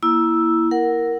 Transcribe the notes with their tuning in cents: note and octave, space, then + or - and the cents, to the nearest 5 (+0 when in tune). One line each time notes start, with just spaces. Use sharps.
A#3 +20 E4 +0 E6 +0
A#4 +0 F#5 -5